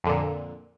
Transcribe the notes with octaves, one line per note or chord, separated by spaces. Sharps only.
F2 A#2 D3